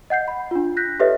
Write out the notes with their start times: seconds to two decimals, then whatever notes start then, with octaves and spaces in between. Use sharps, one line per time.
0.10 D#5 F#5 G6 C7
0.28 B5
0.51 D4 F4
0.77 F#6 G6 A#6 B6
1.00 G4 A4 B4 C#5 D#5 E5